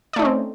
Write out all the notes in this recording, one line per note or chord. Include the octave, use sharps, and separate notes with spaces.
A3 C4 C#4 D#4 D5